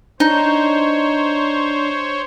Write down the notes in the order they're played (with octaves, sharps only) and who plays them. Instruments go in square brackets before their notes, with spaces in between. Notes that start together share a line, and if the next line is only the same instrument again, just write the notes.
[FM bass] D4 [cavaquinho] D#4 [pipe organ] C5 C#5